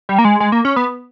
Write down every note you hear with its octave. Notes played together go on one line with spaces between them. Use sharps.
G3
A#3
G#3
G#3
A#3
C#4
B3